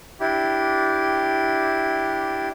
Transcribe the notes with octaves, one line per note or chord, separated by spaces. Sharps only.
D4 E4 G4